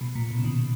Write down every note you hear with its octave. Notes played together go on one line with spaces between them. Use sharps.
B2
A#2
B2
C#3
B2 D#3